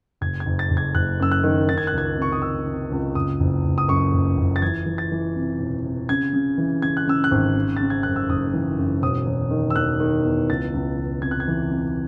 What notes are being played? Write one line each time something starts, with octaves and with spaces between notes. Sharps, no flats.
F#1 G#6
G#6
F#1
A6
F#1
G#6
F#1 F#6
F#2 E6
F#6
D#3
D#3 A6
G#6
F#6
C#2 G#6
C3 C#6
D#6
D#3 E6
C3
C#2
F#1 D#6
F#1
F#1
D#6
F#2 C#6
F#1
F#1
A6
E3 G#6
E3
A6
E3
C3
E1
C3
C#3 G#6
C#3
E3
C#3 G#6
F#6
C#3 E6
F#6
G#1
C#3
C#3 A6
G#6
F#2 F#6
E6
F#1 D#6
E3
F#2
E1 D#6
E1
D#3
E6
E1 F#6
D#3
E2
C#2 A6
C#2
C#2
C3 G#6
F#6
G#6
E3
C3